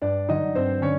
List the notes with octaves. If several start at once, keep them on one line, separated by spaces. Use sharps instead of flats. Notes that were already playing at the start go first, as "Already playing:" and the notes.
G2 D4 D5
D3 F#3 D#4 D#5
G2 C4 C5
D3 C#4 C#5